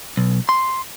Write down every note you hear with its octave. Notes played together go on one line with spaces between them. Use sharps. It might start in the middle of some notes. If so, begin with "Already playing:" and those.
B1
C6